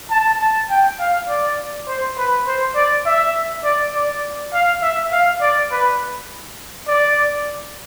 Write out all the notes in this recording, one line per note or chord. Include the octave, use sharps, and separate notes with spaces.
A5
A5
G5
F5
D5
C5
B4
C5
D5
E5
D5
D5
F5
E5
F5
D5
B4
D5